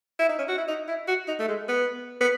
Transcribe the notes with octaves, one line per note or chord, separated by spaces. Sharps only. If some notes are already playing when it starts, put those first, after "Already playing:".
E4
D#4
C#4
F#4
E4
D#4
E4
F#4
D#4
A3
G#3
B3
B3